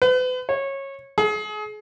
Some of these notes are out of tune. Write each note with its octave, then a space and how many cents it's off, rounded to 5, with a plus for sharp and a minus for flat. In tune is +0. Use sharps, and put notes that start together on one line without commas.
B4 +40
C#5 -20
G#4 +35